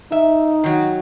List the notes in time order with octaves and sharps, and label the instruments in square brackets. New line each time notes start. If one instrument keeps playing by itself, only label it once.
[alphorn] D#4 [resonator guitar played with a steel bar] E5
[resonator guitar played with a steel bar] D#3 F#3